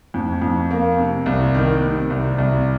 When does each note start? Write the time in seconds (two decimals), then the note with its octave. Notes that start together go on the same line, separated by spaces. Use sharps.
0.14 F2
0.42 F2
0.71 A#3
0.99 C3
1.26 C2
1.55 D#3
1.81 C3
2.10 C2
2.38 C2